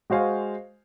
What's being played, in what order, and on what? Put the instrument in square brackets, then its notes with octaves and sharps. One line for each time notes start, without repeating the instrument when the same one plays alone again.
[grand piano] G#3 F#4 C5 F5 G#5